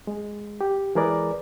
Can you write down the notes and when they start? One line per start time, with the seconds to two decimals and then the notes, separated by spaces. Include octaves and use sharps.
0.07 G#3
0.61 G4
0.95 E3 G#3 G#4 A#4 B4 D5